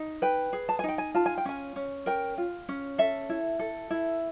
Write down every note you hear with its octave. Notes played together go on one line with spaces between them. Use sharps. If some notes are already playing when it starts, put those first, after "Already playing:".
Already playing: D#4
B4 G5
G#4
A5
G#5
D#4 G5
G#5
F4 A5
G#5
G5
C#4 G#5
C#4
A#4 G5
F4
C#4
A4 E5
E4
A4
E4